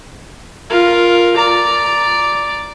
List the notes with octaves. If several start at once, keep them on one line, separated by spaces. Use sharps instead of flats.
F4 A#4
D5 A#5